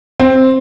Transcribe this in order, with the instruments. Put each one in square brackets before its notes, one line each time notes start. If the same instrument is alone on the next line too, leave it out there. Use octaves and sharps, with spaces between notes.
[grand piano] C4